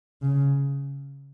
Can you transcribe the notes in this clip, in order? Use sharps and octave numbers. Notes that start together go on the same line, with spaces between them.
C#3